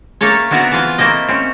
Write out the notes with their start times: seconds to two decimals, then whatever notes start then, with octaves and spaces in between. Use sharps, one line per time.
0.21 A3 A#3 C#4 A4 C#5
0.51 B3 C4 E4 F#4 D5 A#5
0.71 E3 F4 G#5
0.98 A3 A#3 C4 E4 D#5
1.29 C4 C#4